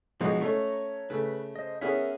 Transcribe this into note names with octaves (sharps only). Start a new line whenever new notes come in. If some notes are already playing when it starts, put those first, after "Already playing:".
B1 F3 G#3 B3 F#4 D#5
A3 C#4 C#5 A#5 C#6
C#3 A3 B4
C5 D#5
B3 C#4 G#4 A#4 E5